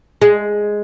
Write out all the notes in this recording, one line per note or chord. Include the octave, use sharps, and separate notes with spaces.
G#3